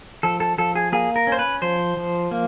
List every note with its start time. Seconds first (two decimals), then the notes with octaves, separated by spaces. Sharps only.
0.23 F3 A4
0.40 A4
0.58 F3 A4
0.75 G#4
0.92 A#3 G#4
1.16 A#4
1.27 C#4
1.32 C5
1.39 B4
1.62 F3 C5
1.97 F3
2.31 A#3